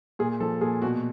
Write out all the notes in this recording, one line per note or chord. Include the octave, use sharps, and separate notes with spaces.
A#2 G#4
F3 A4
A#2 G#4
B2 F#4